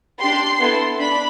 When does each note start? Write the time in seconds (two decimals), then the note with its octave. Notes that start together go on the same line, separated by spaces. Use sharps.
0.20 D4 G4 C6
0.59 B3 E4 A4
0.99 D4 B5